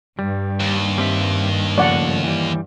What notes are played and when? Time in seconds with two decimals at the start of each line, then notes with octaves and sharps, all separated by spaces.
0.19 G2 G3
0.60 D#2
0.98 G3 C4 E5
1.78 C#3 F3 A3 D5 F#5
2.24 E3 G3